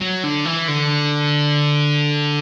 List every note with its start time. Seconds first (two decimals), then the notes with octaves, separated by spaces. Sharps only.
0.01 F#3
0.23 D3
0.45 E3
0.68 D3